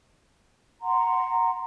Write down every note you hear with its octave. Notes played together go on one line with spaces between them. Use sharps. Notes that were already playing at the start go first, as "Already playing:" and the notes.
F#5 A#5 C6